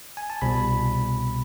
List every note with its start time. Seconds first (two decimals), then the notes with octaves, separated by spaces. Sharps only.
0.17 G#5
0.30 A5
0.42 C2 B2 B5